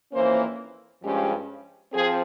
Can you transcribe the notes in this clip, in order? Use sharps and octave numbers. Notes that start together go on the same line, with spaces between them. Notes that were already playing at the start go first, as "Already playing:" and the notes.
F2 E3 A#3 C#4 C5
G2 F3 G#3 C#4 G4
F3 C4 G#4